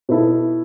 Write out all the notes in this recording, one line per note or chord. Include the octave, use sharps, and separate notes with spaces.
B2 B3 E4 A4